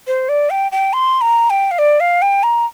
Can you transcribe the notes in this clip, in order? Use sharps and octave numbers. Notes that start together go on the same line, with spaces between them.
C5
D5
G5
G5
C6
A#5
G5
F5
D5
F5
G5
A#5